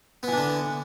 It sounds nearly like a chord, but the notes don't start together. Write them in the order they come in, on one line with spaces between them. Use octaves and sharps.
B3 E3 D4 D3